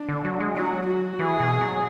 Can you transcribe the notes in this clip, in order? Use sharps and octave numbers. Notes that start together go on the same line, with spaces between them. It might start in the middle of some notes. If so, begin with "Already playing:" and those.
Already playing: D4
D3
F#3
G#3
F#3 F#4
F#4
E3 G#4
B2
F#3